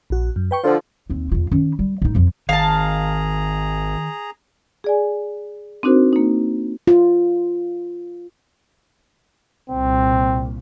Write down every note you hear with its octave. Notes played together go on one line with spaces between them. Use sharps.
A#1 F#4
F#2
B4 G5 C#6
D3 F3 C5 F#5
D#2 C4
E2 F4
D#3 C#4
G3
A1 D#4
F2 F3
G#1 D#3 G#4 F5 A5 A#5
G#4 D5 G#5
C4 D4 D#4 F#4 A#4 C5
A#3 D#4
F4
C2 A#2 C4